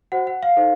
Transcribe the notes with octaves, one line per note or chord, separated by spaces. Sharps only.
F#4 C5 F#5
F#5
F5
D#4 A4 C5